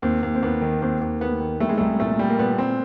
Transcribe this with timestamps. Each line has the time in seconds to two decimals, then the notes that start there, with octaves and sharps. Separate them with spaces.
0.02 D#2 C4
0.23 D#2
0.35 C4
0.42 D#2 B3
0.62 D#3
0.82 D#2 C4
1.01 D#2
1.20 D#2 B3
1.40 D#3
1.60 G3 A3
1.69 G#3
1.77 C2 A3
2.00 A#2 A3
2.19 G3
2.30 A#3
2.39 A#2 B3
2.58 C4